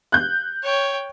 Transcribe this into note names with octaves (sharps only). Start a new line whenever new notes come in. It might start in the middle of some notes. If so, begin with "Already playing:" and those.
F#6 G6
C#5 G5